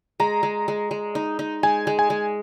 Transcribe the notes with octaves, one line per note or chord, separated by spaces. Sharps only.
G#3 A#5
G#3
G#3
G#3
D#4
D#4
G#3 G#5
G#3
G#5
G#3